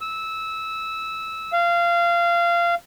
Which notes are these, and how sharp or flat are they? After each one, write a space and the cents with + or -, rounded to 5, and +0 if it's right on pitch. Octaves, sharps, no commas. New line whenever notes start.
E6 -15
F5 -20